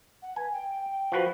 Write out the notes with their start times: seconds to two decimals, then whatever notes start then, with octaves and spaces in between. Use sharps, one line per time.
0.22 F#5
0.36 B4 G#5
0.52 G5
1.12 F3 F#4 B4